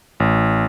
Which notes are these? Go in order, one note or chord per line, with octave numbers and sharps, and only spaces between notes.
A1